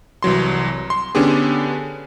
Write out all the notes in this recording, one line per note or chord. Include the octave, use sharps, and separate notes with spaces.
C2 E3 F#3 C6
C6
D3 B3 C#4 D4 G4 G#4